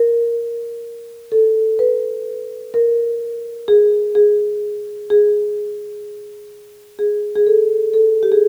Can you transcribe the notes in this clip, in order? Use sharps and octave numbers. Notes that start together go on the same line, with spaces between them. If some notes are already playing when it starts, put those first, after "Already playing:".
Already playing: A#4
A4
B4
A#4
G#4
G#4
G#4
G#4
G#4
A4
A4
G4
G#4